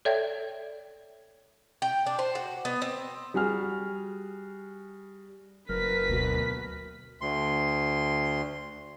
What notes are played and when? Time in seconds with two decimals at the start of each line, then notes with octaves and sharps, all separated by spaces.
0.05 A4 C#5 D5 E5 G5 G#6
1.82 G5
2.07 D4
2.19 C5
2.35 F#4
2.65 B3
2.82 C4
3.34 G3 F#4 G#4 F6
5.69 F#1 F#3 A#4 B4 B6
6.09 D2 B2 A#3 F#4
7.21 D2 C6